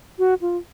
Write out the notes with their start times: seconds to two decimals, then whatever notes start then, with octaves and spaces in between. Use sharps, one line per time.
0.19 F#4
0.42 F4